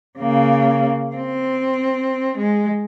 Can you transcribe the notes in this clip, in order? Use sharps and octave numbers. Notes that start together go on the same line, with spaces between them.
C#3 A#3
C4
G#3